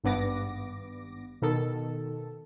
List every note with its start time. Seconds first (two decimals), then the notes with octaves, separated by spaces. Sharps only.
0.04 G#1 G2 B3 D6 A#6
1.42 B2 D#3 A4